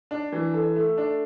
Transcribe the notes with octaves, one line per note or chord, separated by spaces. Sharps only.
D4
E3
A4
A3
D4